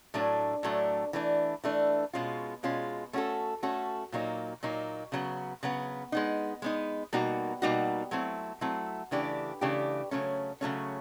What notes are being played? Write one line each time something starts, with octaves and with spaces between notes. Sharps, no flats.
A2 F#3 A3 D4
A2 F#3 A3 D4
E3 A3 D4
E3 A3 D4
B2 G#3 C#4 F4
B2 G#3 C#4 F4
A3 C#4 F#4 A4
A3 C#4 F#4 A4
A#2 F#3 A#3 D#4
A#2 F#3 A#3 D#4
C#3 F#3 B3
C#3 F#3 B3
G#3 B3 D#4
G#3 B3 D#4
B2 G3 A#3 D#4 F#4
B2 G3 A#3 D#4 F#4
F#3 A3 C4 E4
F#3 A3 C4 E4
C#3 E3 A3 D4 G4
C#3 E3 A3 D4 G4
C#3 F#3 A3 C#4
C#3 F#3 A3 C#4